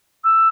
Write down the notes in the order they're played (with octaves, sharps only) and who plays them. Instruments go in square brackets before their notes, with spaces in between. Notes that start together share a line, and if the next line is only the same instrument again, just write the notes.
[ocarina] E6